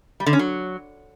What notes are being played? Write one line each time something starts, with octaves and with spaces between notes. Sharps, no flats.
G3
D3
C#4
F#3